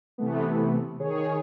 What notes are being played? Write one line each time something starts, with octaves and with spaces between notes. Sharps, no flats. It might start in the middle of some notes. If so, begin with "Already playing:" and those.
C3 E3 A3 B3
D#3 G#4 C#5